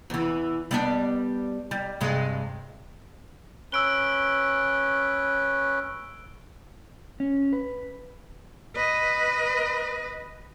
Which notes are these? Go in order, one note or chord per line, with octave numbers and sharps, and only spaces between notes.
E2 E3
G3 B3 D4
G3
G2 C3 G#3
C#4 B4 E6 D7 G7
C#4
B4
B4 D#5